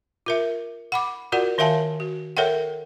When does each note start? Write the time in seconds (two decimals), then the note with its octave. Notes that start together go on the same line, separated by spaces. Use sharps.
0.26 F4 A#4 E5
0.92 F#5 B5 D6
1.32 F4 F#4 A#4 D5 F#5
1.58 D#3 A#4 E5 F5 G#5 A5
2.00 F#4
2.37 A4 A#4 C#5 E5 F#5 G5